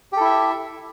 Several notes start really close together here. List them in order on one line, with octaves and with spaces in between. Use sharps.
G4 A4 E4 E5